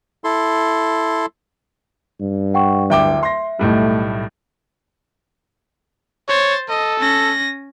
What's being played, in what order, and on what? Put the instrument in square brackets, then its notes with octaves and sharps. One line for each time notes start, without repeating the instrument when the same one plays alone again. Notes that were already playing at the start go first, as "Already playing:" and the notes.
[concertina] E4 A4 C6
[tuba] G2
[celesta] F#5 G5 C#6
[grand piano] D1 G5 D6 [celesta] E5
[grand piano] C6 A#6
[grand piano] B1 A2 G3 [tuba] A3
[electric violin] C5 A6 [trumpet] C#5
[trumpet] A4 [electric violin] D#5
[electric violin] C#4 A#6